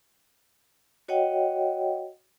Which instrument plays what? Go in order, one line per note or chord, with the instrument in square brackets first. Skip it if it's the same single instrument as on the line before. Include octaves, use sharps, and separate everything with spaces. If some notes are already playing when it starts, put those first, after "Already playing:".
[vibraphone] F#4 C#5 D#5 F#5 G5